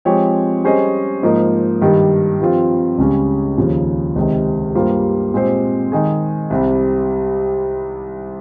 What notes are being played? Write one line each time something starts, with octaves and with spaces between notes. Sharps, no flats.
F3 G#3 C4 G4 C#5
G3 C#4 G#4 C5 D#5
G#2 F3 A#3 D#4
G2 D#3 G3
G2 F3 C4 F4
C#2 C#3 G3 C#4
D#2 C#3 F3
C#2 C3 D#3
G2 G3 A#3 F4 C5
A#2 G#3 C4 G4 C5
D#3 G#3 D#4 G#4
C2 C3 G3